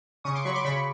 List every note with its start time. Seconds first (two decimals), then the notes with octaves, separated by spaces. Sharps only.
0.24 C#3 C#6 D#6
0.35 C6 D6
0.45 F#3 B5 C#6
0.54 C6 D6
0.65 C#3 B5 C#6